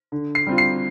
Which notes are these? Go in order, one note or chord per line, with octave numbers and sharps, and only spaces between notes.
D3
C7
G3 C4 F4
C7